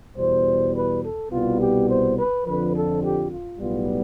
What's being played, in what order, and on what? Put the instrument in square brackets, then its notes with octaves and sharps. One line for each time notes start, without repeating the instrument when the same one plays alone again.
[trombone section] E2 B2 G3 C5
B4
A4
C2 B2 G3 B3 F4
G4
C5
B4
F2 D3 F3 B4
A4
G4
F4
B1 A2 G3 B3 F4